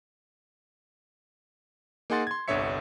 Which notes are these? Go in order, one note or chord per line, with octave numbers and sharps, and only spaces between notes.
A#3 D#4 G#4 F#5 C6 A6
C6 G#6
G1 C2 D3 C#5 E5 C#7